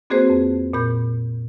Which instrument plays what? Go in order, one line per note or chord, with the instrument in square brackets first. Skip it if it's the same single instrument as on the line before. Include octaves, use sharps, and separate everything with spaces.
[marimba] A#3 C4 F#4 G#4 B4 C5
F2
A#2 B5 G6